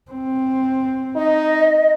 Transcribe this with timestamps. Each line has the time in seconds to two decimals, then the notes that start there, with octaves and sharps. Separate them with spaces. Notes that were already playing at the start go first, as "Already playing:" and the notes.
0.11 C4
1.16 D#4 D#5